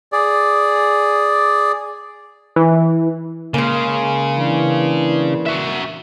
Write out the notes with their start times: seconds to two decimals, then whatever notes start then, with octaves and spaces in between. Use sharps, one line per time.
0.12 G#4 D5
2.56 E3
3.54 C#3 G#3 A#3
4.38 E3 D4
5.47 F#4 E5